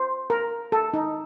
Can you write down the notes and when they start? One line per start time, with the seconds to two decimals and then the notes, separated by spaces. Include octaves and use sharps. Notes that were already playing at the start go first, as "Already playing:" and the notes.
Already playing: C5
0.30 A#4
0.72 A4
0.94 D#4